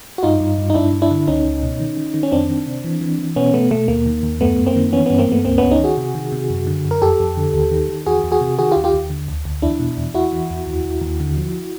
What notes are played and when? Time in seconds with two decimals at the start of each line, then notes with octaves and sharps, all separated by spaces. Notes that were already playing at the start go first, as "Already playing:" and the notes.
0.18 F#4
0.23 G2 D#4 F4
0.40 G2
0.58 G2
0.70 D#4
0.75 G2 D4 E4
0.93 G2
1.02 D4 E4
1.11 D3
1.27 C#2 C#4 D#4
1.45 C#2
1.63 B2
1.80 D#3
1.97 D#3
2.14 D#3
2.23 C#4
2.32 F2 C4 D4
2.49 D#3
2.67 C3
2.84 E3
3.01 E3
3.19 E3
3.36 B2 B3 C#4
3.54 B2 A3 B3
3.71 B2 A3
3.88 D#2 A#3
4.06 D#3
4.23 D#2
4.41 F#2 A3 B3
4.59 F#2
4.67 A#3 C4
4.76 D#3
4.92 E3 B3 C#4
5.06 G2 B3 C#4
5.19 A#3 C4
5.28 G2 A3 B3
5.45 C#2 A#3 C4
5.58 C#2 B3 C#4
5.71 C#4 D#4
5.80 D#3 F#4 G#4
5.97 C3
6.15 D#3
6.32 C3
6.50 F#2
6.67 D3
6.85 F#2
6.91 A#4
7.02 F2 G4 A4
7.20 F2
7.37 D3
7.54 D#2
7.71 D#3
7.89 D#3
8.06 E2 F#4 G#4
8.24 E2
8.32 F#4 G#4
8.41 C3
8.59 D#3 F#4 G#4
8.71 F4 G4
8.76 D#2
8.84 F4 G4
8.94 D#2
9.10 D3
9.28 D2
9.45 D2
9.62 E2 D4 E4
9.80 B2
9.98 E2
10.14 E2 E4 F#4
10.32 E3
10.50 E2
10.67 D#2
10.84 D#2
11.02 D#2
11.20 D3
11.37 F3